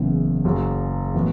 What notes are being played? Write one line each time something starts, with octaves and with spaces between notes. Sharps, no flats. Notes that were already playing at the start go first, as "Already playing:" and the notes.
Already playing: F#1 E2 C#3 E3
F#1 F#2 C#3 F#3
A2 E3 B3 F#4